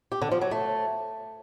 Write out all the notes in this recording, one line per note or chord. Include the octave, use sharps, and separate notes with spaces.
G4
D3
F3
F#3
A3